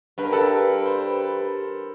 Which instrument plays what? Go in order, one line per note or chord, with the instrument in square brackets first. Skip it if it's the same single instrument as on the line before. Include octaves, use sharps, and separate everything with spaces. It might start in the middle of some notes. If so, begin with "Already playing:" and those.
[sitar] G2 [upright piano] B4
[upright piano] A#4
A4 B4
C5